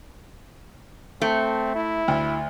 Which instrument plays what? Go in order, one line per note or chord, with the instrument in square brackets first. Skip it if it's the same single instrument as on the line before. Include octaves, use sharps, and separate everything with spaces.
[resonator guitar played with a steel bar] A3 [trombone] C4
[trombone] E4
[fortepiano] D2